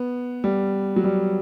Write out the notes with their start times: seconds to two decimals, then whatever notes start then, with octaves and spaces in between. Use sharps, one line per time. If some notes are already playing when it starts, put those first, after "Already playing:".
Already playing: B3
0.44 G3
0.96 F#3
1.04 G3